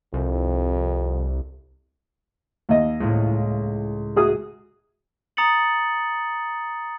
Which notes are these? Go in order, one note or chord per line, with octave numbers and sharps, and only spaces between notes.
C2 F2
D#2 D#5
C#2 A2
F#4 G#4 D#6
A#5 D#6 A6 C#7 F#7